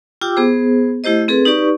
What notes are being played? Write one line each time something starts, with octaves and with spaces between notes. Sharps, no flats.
F4 G4 G5 D6 E6
B3 G#4 C5
A3 E4 G4 C5 D#5
C4 G#4 A4 B4
D#4 G4 B4 D5 C#6